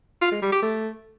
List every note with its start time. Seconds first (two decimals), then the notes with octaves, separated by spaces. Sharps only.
0.22 F4
0.32 G#3
0.42 G3
0.52 G4
0.63 A3